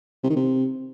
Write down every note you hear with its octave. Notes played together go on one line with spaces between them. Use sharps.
C3
D#3
C3